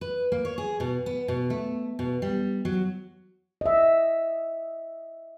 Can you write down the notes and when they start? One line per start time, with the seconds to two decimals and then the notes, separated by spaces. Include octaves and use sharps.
0.01 B4
0.32 A#3
0.45 C#5
0.58 G#4
0.80 B2
1.06 B3
1.28 B2
1.50 A3
1.99 B2
2.22 G3
2.65 F#3
3.61 D#5 E5